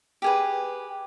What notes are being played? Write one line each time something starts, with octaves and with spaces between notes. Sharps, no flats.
G4 G#4 B4